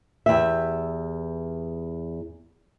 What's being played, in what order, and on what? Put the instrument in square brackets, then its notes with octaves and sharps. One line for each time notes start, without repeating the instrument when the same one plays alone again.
[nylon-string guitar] E2 G4 E5